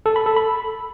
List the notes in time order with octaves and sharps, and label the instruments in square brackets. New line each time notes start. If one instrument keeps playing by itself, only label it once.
[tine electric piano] A4
B5
A4
B5